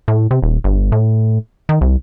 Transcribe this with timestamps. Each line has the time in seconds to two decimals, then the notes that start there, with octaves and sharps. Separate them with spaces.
0.08 A2
0.31 C3
0.43 D#1
0.64 G1
0.92 A2
1.69 D#3
1.81 C2